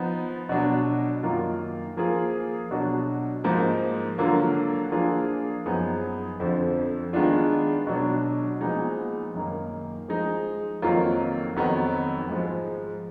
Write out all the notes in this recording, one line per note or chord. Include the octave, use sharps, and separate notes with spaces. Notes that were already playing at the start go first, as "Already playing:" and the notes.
Already playing: F3 B3 D#4
B2 F#3 D4 F#4
F#2 D#3 A#3 F4
F3 A#3 F4 G#4
B2 F#3 D4 F#4
G#2 F3 A#3 D#4
D3 F#3 A#3 F4
F3 A#3 D4 F4 G#4
F#2 F3 B3 D#4 G#4
F2 D3 F3
D#3 G#3 B3 D4 F4
B2 F#3 D4
A#2 F3 G#3 B3 D#4
F#2 D#3 A#3
F3 G#3 D#4
F2 D#3 F#3 A#3 F4
F2 D#3 F#3 B3
G#2 F3 G#3